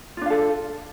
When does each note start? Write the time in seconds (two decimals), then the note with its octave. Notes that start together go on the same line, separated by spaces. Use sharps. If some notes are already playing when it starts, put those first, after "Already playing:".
0.17 F4
0.21 D4
0.26 F5
0.30 A4